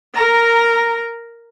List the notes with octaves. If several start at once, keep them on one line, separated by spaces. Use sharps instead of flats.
A#4 A#5